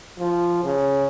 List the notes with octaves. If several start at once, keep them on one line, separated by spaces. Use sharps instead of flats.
F3
C#3